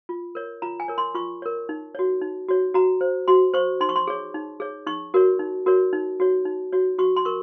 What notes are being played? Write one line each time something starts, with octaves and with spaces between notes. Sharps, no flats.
F4
A#4 C#5
F4 A#5
G#5
A#4 C#5
C6
F4 C#6
A#4 C#5
D#4
F#4 C#5
D#4
F#4 C#5
F#4 A#5
C5
F#4 C6
C5 C#6
D#4 C6
C#6
C6
G#4 C#5
D#4
G#4 C#5
D#4 C#6
F#4 A#4 C#5
D#4
F#4 A#4 C#5
D#4
F#4 C#5
D#4
F#4 C#5
F#4 C#6
C6
A#4 C#6